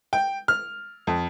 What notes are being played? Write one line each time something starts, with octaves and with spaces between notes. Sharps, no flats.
G5
F6
F2